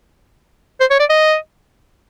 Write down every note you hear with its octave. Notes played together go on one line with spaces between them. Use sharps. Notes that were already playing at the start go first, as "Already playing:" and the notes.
C5
C#5
D5
D#5